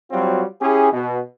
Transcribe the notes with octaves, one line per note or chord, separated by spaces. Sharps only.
F#3 G3 C4 F4 F#4 C#5
C#4 E4 G4 G#4
B2